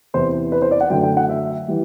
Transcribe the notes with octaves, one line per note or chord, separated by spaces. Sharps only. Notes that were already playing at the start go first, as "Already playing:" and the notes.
E2 C3 E3 B3 C5
B4
C5
D5
F#5
F#2 D3 F#3 A3 G5
G5
F#5
E5
E3 G3